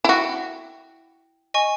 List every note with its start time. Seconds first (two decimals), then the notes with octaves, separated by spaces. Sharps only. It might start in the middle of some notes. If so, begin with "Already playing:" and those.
0.04 E4 F#4 G5
1.54 D#5 G#5 C#6